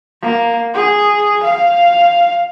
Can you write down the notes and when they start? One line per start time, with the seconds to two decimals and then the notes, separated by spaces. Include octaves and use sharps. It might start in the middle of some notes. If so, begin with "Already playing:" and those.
0.22 A#3
0.74 G#4
1.43 F5